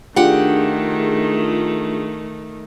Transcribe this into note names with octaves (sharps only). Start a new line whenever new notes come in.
D#3 A3 D4 F4 G4 G#4 F#5